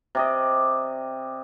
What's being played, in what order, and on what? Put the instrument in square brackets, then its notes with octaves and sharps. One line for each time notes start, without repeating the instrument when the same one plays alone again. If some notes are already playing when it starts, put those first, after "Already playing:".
[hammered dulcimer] C3 D5 D#5